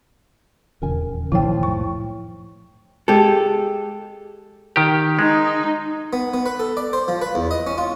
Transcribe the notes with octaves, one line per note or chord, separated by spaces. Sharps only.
D#1 E2 C#3 A#4 G#5
C2 A#2 D#3 F3 E4 C#5 G5
F2 A2 C#6
G#3 G4 A4
D#3 G4
G#3 D#4
B3
B3
B4
A4
D5
C5
F3
B4
E2
D#5
C#4
F4